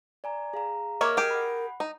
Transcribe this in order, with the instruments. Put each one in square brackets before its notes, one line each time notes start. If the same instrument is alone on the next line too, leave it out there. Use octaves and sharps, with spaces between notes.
[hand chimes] D5 G#5 A#5
G#4 F5 A#5
[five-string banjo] A#3 C#5 E5 [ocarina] A#4 [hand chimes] D#5 D6 F6
[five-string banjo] G4 G#4
[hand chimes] F#5 B5
[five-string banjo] D#4